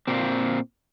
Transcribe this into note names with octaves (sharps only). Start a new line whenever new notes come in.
A#2 A#3 C4